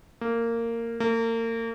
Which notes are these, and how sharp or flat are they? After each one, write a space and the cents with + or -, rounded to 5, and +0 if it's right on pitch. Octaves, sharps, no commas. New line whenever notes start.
A#3 -15
A#3 -35